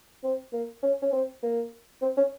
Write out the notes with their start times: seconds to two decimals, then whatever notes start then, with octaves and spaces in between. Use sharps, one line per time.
0.24 C4
0.53 A#3
0.83 C#4
1.02 C#4
1.13 C4
1.43 A#3
2.02 C4
2.17 C#4